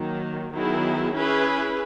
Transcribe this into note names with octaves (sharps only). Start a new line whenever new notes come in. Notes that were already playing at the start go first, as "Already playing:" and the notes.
Already playing: D#3 F#3 A#3
D#3 F#3 B3 E4 G#4
C#4 E4 G#4 B4